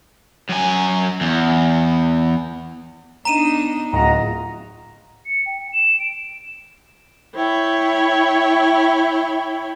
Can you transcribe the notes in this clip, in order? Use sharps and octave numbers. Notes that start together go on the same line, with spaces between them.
F#2 G#5
E2
B3 D4 D#4 A#5 D#7 E7
D1 F4 D#5 F#5 A#5
C#7
G5
E7
D7
E4 C#5 G5 B5